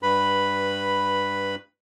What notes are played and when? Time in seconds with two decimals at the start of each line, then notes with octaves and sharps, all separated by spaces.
0.03 G2 B4 B5